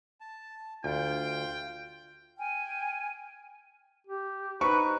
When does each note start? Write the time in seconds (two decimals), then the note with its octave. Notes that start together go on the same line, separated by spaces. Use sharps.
0.21 A5
0.84 D2 F4 G5
2.38 G5 G#5 F6
4.07 G4
4.61 D#4 B4 C5 A#5 C#6 F#6